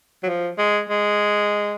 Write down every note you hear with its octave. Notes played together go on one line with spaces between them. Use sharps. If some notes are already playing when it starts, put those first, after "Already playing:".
F#3
F3
G#3
G#3